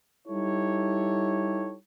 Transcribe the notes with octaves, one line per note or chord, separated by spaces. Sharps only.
G3 D#4 E4 G4 A4 C#5